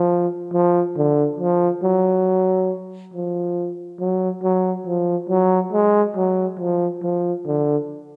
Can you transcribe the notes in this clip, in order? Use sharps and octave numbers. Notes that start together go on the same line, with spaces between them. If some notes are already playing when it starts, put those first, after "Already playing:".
Already playing: F3
F3
D3
F3
F#3
F3
F#3
F#3
F3
F#3
G#3
F#3
F3
F3
D3